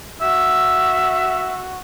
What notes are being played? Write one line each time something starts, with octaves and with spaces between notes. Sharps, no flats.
F#4 E5